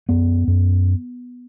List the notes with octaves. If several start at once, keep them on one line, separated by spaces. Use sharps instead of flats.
F#2 B3
F#2